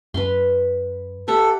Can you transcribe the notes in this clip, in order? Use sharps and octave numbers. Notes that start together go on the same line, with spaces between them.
F#2 B4 F5 C6
G4 A4 E5 F#5